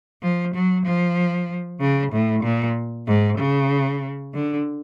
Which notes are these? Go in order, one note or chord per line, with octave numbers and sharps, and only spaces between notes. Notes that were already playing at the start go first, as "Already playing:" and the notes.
F3
F#3
F3
C#3
A2
A#2
G#2
C#3
D3